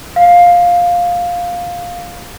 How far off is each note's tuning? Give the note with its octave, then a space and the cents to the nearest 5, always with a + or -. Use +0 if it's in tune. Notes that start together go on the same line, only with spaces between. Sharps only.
F5 +10